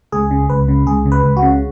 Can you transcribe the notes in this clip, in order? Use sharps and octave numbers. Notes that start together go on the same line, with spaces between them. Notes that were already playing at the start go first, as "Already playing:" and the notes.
C#2 G#4
C#3
C#2 B4
C#3
C#2 G#4
C#3
B4
C#2
F#4
C#3